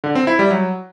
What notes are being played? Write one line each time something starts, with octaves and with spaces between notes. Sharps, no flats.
D3
C4
E4
G3
F#3